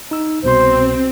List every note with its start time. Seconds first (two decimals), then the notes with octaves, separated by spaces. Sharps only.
0.11 D#4 E6
0.43 C2 B2 C4 C5 C6